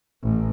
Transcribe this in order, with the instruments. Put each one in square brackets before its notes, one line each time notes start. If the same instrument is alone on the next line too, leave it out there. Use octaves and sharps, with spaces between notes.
[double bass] A1